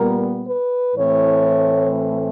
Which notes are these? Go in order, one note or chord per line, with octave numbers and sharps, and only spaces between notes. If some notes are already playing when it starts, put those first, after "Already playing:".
Already playing: A#2 G3 B3 A#4
B4
A2 E3 A3 C4 C#5